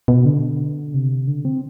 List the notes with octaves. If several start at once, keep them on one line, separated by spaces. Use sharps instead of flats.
B2
D3
C3
D3
C4